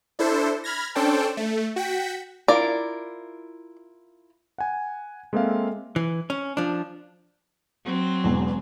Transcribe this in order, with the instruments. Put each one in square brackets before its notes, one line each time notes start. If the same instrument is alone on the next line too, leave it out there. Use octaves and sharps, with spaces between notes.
[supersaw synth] D4 E4 A4 C5
B5 F6 G#6 A#6
C#4 D4 A4 C5 G5 A5
A3
F#4 G5 B6
[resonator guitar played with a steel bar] E4 F4 A#4 [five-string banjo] D5
[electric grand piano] F#5 G#5
G#3 A#3 C4 A4 E5 F5
[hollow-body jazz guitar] E3
C#4
F3 D4
[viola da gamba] F#3 C4
[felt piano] E1 E2